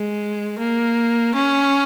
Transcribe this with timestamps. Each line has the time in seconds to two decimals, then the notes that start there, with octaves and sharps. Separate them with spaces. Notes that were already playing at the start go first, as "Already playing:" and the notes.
Already playing: G#3
0.59 A#3
1.34 C#4